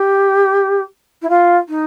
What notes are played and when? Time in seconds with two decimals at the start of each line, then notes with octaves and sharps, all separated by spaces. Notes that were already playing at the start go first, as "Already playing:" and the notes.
Already playing: G4
1.22 E4
1.30 F4
1.69 D#4